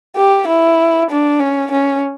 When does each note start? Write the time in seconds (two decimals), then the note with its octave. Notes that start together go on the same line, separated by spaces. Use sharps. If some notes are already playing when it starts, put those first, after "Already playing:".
0.16 G4
0.48 E4
1.10 D4
1.40 C#4
1.71 C#4